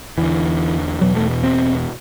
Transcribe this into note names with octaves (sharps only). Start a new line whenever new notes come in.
E2 D3 E3
E2 B2 F#3
A3
C4